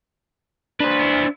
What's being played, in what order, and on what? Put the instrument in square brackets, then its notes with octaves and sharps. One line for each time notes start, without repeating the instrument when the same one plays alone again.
[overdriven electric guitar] D4 C5 [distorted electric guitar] B4
[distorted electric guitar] B3 E4